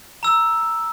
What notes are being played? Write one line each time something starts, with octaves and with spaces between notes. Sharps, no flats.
A#5 E6